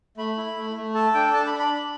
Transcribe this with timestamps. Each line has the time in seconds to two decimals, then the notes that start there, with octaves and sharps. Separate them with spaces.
0.17 A3 B5
0.37 E4
0.56 A3
0.76 A3
0.94 A4 A5
1.14 D4 G5
1.33 D4 A5
1.47 B5
1.53 D4
1.59 B5
1.72 D4